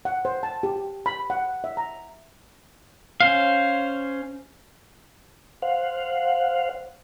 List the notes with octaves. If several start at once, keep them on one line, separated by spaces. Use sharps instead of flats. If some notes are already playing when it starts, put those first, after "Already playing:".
F#5
C5
A5
G4
B5
F#5
E5
A#5
C#4 C5 F5
C5 F5 F#5